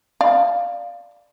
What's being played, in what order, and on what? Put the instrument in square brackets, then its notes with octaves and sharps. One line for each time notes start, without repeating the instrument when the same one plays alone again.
[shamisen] D5 F5